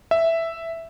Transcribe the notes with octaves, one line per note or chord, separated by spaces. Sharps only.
E5